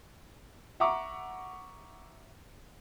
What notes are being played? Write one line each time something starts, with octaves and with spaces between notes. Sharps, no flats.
E5 F#5 A#5 C#6 D6